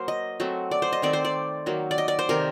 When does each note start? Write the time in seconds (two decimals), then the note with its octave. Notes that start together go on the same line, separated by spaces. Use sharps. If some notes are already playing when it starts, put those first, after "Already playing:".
Already playing: F#3 A#3 C5
0.08 D#5
0.40 F#3 A3 C4
0.71 D5
0.82 C5
0.93 D#5
1.02 D#3 A3 C4 D5
1.13 C5
1.25 D5
1.66 D#3 F#3 A#3
1.91 D5
1.98 D#5
2.08 D5
2.19 C5
2.29 C3 D#3 A3 A#4